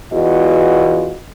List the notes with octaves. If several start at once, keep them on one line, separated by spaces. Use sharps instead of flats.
E2 E3 F4 F#4 D#5